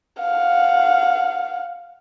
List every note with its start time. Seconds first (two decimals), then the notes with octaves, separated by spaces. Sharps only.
0.20 F5 F#5